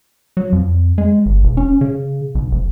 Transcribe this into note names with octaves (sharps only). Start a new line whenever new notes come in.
F#3
F2
G#3
G1
E1
C#4
C#3
B1
F1